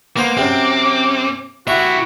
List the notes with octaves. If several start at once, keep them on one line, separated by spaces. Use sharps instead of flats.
A#3 B3 C5 D6
F#2 C3 C4
E4 F#4 G4 E5